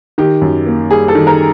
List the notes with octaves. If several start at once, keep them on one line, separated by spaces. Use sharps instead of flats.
D#3 G4
F#2
A#3
G3 G#4
A4
D#3
A#4